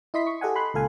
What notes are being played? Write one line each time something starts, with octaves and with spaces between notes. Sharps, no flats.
E4 D#5 C6 B6
C#6
G4 A4 D#5 F#5 G#5
B5 C6 F#6
C#2 A#2 A4 F5 G#5